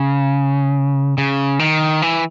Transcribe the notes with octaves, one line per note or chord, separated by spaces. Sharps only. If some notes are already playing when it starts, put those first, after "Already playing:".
Already playing: C#3
C#3
D#3
E3